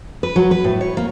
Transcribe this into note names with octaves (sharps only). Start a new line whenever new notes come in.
B4
F#3
B4
A2
C#5
A#3